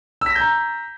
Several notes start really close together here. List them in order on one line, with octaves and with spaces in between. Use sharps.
E6 B6 A#6 G6 A#5